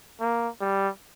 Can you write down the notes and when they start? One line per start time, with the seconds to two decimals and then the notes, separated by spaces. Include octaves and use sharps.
0.20 A#3
0.61 G3